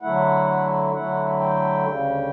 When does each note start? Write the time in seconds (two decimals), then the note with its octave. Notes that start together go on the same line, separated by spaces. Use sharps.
0.02 D3 F#3 A3 E4 F#5
0.94 D3 F#3 A3 E4 F#5
1.40 G5
1.86 D2 C#3 G3